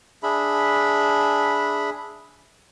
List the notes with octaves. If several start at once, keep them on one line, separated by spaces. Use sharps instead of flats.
D4 G#4 E5 B5